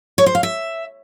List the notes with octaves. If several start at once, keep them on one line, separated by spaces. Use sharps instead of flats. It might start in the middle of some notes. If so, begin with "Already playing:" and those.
C#5
C5
F5
E5